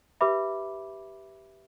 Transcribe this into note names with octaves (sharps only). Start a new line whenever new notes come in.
G4 B4 E5 B5 D6